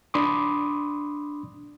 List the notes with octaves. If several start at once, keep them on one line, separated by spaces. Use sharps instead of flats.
D4 B5 C6 D6 D#6